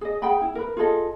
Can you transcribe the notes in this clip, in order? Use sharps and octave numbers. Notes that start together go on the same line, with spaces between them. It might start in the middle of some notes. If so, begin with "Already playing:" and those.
G#4 D#5
G#4 F#5 G5 B5
E4
A#4 B4
F4 G#4 A4 D#5